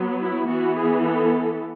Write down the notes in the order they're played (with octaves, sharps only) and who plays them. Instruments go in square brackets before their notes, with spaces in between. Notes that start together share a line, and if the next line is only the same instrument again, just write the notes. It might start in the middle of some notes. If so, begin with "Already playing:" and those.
Already playing: [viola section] F#3 B3
E4
E3 B3 F#4
G#4
A4